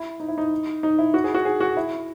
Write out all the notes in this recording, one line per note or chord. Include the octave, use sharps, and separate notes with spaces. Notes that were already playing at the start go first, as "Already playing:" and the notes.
Already playing: E4
D#4
E4
D#4
D#4
E4
F#4
G#4
F#4
G#4
F#4
E4